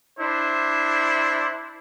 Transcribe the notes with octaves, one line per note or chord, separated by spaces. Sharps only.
D4 E4 C5